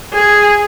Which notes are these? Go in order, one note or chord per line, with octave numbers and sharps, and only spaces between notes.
G#4